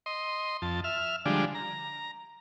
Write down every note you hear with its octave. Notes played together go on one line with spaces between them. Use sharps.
D#5 C6
F2 A5
E5 F6
D3 F3 G3 G#3 D4
A#5